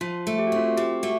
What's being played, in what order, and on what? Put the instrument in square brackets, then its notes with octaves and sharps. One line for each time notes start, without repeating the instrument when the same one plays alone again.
[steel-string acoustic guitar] F3 [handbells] F4
[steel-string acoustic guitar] A3
[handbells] G4
F#4
[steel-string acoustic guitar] C4 [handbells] F4
[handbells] F#4
[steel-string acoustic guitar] F3 [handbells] G4
[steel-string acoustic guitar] A3 [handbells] F#4